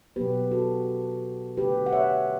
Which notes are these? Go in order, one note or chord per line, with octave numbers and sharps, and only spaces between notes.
B2 F#3 B3 G4 B4
F#4 A4
D3 A3 G4 B4
F#5
C#5 E5